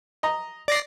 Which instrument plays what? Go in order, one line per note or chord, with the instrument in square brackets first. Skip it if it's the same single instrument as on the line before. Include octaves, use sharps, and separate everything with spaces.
[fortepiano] D#5 A#5
[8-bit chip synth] D5 A#6 C7